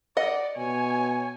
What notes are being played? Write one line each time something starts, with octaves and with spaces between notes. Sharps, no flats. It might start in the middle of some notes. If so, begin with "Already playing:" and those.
D5 D#5 F#5
B2 C#5 G#5